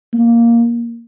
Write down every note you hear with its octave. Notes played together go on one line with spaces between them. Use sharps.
A#3